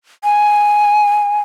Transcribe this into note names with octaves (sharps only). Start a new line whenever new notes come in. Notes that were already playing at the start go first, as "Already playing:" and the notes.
G#5